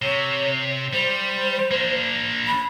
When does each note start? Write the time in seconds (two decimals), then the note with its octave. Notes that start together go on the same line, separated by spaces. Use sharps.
0.02 C3 C#5
0.93 G3 C5
1.71 A#3 D4
2.47 B5